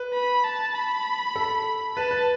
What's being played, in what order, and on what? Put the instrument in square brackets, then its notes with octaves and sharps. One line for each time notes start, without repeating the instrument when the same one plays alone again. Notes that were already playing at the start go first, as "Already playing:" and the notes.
Already playing: [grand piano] B4
[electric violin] B5
A5
B5
[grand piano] A4
[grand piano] B4 [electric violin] A5
[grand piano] B4